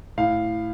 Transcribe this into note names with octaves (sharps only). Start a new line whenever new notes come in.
A2 F5